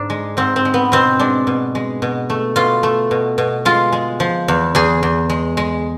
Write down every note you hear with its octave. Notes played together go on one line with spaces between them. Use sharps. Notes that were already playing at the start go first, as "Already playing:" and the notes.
Already playing: G#2 D4
G#3
G#2 C4
C4
G#3
B3
B2 C4
G#3 D4
B2
G#3
B2
A3
B2 F4
A3
B2
B2
G#3 F4
G#3
F3
E2
E2 G#4
E2
G#3
G#3